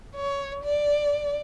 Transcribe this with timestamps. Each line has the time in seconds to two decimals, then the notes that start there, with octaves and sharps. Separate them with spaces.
0.15 C#5
0.64 D5